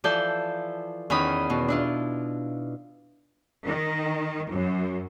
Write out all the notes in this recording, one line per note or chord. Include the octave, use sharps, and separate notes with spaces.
E3 F3 A4 D5 G6
E2 D#3 C#4 B5 D#6
B2
D4 E4 F4
D#3
F#2